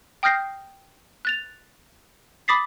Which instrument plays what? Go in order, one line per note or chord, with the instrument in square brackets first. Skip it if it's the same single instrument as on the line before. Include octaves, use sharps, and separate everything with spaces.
[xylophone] G5 D#6 F6 G6 A#6 C7
F#6 A6 F7
B5 D6 D#6 A6 B6 C7